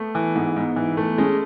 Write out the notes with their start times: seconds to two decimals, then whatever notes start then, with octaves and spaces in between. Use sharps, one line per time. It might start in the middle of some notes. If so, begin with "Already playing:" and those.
Already playing: A3 B3
0.15 E3
0.35 G#2 B3
0.56 G#2
0.76 E3
0.97 A3
1.18 G#3 C#4